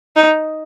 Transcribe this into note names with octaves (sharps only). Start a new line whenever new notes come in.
D#4